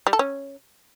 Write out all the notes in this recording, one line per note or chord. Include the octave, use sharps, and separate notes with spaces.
G3
A4
C#4